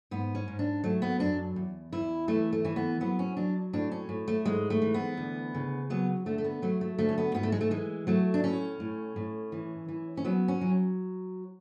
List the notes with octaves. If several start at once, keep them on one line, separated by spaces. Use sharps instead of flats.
G#2 B3
C#4
G#2
D4
F#3 A3
B3
F#2 D4
E2
E2 E4
E3 A3
A3
E3 C#4
B3
F#3 B3
C#4
F#3 D4
A2 D4
C#4
A2
A3
G#2 G#3
A3
E3
B3
D2
C#3
F#3 B3
D3 A3
A3
B3
F#3 A3
A3
D2 A3
C#4
B3
G#2 B3
A3
G#3
A3
E3 G#3
F#3 A3
D4
A2 C#4
A2
A2
E3
E3
C#4
F#3 B3
C#4
F#3